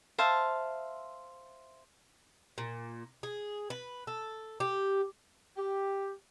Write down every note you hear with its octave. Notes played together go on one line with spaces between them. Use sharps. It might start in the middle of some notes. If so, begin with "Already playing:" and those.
C5 E5 F5 A5
A#2
G#4
B4
A4
G4
G4